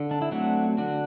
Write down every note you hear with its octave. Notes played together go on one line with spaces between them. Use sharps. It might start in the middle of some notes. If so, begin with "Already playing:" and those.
Already playing: D3
D4
E4
F#3 A3 C4 D4 F#4
D3 D4 F#4